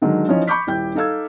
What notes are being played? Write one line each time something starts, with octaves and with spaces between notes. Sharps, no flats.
D3 D#3 F#3 G#3
E3 F3 C#4 D#4 C#5 D#5
B5 C#6 D6 G6 B6
D#1 E4 G5 G6
D#4 A4 F5 E6 G#6